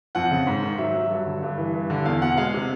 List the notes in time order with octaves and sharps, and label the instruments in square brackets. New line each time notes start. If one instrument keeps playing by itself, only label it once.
[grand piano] F2 F#5
C#3
G#2
D#3
F#3 E5
F#3
G2
D3
G2
E3
G2
D3
E2 F5
B2 F#5
G#3 F5
C3